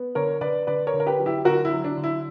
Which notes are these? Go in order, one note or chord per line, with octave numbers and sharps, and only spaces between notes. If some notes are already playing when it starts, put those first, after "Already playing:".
Already playing: B3
D3 A#4 C#5
D3 B4 D5
D3 B4 D5
A#4 C#5
D3
A#4
G4 B4
F#3
E4 G4
D3 F#4 A#4
E4
F#3
D4
D3
E4